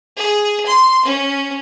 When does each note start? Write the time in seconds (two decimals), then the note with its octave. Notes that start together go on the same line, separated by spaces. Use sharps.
0.17 G#4
0.66 C6
1.05 C#4